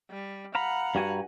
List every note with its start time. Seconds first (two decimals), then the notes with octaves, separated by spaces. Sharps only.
0.10 G3
0.55 F5 F#5 A#5 B5
0.95 G2 F#4 G#5